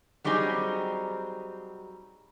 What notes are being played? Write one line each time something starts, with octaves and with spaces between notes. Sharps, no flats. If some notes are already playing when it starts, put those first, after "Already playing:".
F#3 G3 C4 D#4 G#4